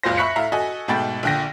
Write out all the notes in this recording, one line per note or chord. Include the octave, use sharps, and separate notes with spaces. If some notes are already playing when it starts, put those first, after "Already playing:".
F#1 C#2 A#2 F4 C5 A#6
E5 B5 C#6 F#6 B6 C#7
A2 E5 F5 A#5
F#4 A4 D#5 G#5
G#2 B2 A3 G5 B5 A6
A#1 A#2 D3 G5 A#6